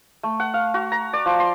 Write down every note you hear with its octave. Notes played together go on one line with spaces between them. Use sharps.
A3
F#5
F5
F#4
A#5
D5
F3
C6